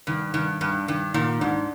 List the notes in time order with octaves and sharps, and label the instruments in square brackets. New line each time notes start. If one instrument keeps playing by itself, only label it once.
[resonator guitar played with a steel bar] G2 [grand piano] D#3
[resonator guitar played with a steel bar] G2 [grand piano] D#3
[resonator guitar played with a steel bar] G2 [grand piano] D4
[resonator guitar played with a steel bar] G2 [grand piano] D#3
[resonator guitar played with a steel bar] A#2 [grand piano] D#3
[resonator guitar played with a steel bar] G#2 [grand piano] D4